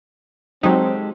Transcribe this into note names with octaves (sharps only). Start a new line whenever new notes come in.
F#3 G#3 C4 D#4 G4 A4